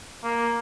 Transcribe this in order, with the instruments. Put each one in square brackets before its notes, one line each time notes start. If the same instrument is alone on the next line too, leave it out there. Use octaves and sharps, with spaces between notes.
[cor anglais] A#3